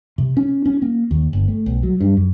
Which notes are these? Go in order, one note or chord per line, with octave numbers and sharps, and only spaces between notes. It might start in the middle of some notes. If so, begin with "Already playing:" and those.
C3
C#4
C#4
A#3
D#2
G1
A3
B1
F#3
G2
F#2